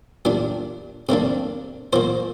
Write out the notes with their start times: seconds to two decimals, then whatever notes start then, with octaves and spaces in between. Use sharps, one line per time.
0.25 A#2 G3 D4
1.09 C3 G3 A#3 D4
1.93 A#2 F3 A#3 C5